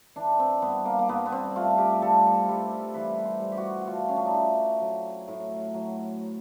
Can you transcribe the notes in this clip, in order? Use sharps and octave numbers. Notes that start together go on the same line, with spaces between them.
E3 D4
C4
G2 B3
A#3
A#3
G2 B3
B3
C4
A3 F4
G4
G3 A4
G3
E3 B4
C5
G3
G4
F#4
F#4
A3 F4
C#4
D4
D#4
A3 E4
F#3
A2
F#3